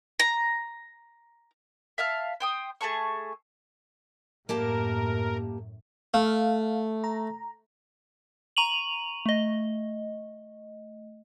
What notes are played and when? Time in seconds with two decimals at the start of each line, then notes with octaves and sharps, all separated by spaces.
0.20 A#5
1.98 E5 F5 A5 F6
2.40 C5 G5 D#6
2.81 A3 G#4 A5 C#6
4.49 F#2 A2 A#3 G4 A#4 A5
6.14 A3 F5
7.04 A#5
8.57 A#5 C#6 D#7 F7 F#7
9.26 A3 D#5